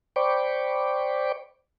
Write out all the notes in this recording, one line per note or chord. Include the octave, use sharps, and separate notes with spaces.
C5 D5 G5 B5 C#6 D6